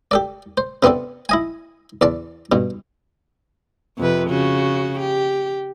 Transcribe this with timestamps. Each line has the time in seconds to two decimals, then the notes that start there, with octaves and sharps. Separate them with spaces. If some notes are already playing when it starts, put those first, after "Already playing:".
0.11 G4 A4 D5
0.57 C5
0.83 C3 B3 C4 D4 A4
1.29 E4 D#5 G#5
2.01 E2 D5 A5
2.52 G2 B2
3.98 F2 C3 B4
4.28 C#3 F#4
5.00 G4